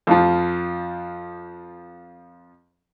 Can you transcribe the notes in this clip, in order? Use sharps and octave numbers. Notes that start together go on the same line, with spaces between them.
F2 F3